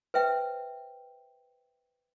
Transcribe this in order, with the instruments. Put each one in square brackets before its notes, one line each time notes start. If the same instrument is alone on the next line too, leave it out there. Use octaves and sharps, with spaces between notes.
[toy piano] B4 C5 E5 G5